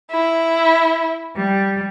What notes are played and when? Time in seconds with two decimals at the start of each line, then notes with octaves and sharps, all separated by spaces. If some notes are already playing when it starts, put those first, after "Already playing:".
0.12 E4
1.36 G3